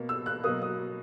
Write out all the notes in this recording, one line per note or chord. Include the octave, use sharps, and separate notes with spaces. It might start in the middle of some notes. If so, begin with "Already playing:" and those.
Already playing: B2 A#3
E6
F#6
B2 F#3 A#3 D#6
D#6